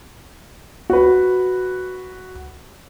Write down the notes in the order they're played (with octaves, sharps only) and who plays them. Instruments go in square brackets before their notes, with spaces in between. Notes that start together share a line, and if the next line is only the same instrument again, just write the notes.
[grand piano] F#4 B4